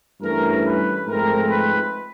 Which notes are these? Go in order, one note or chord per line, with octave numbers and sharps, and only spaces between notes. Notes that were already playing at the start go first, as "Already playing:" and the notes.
G2 E3 A3 C#4 A#4
B4
G#2 F3 A3 C4 A#4
B4